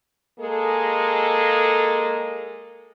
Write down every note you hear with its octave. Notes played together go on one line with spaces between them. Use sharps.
G#3 A#3 G#4 A4